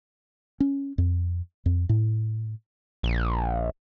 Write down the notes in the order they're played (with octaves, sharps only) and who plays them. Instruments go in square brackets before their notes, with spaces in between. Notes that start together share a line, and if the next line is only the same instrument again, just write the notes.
[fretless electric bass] C#4
F2
F2
A2
[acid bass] A#1